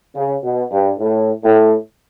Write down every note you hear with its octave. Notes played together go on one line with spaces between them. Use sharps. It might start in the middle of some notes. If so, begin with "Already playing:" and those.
C#3
B2
G2
A2
A2